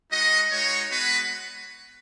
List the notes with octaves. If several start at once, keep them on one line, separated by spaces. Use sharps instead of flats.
G#3 D#4 F#4 D#5
G#3 D#4 F#4 C#5
G#3 B3 F#4 B4